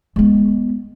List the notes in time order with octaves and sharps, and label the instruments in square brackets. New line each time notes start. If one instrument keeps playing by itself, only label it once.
[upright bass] G#3 B3